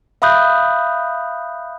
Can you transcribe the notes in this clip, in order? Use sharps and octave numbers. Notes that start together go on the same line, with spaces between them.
E5 F5 B5 D#6 F#6 G6